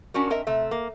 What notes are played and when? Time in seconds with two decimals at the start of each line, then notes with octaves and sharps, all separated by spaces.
0.14 C#4 D4 F#4 A#4
0.30 C4 A#4 D#5 E5
0.47 C3 A3 E5
0.71 A#3